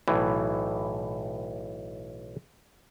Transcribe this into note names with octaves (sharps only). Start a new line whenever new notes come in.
B1 A2 E3